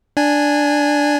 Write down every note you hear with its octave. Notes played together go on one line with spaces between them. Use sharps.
D4 G#5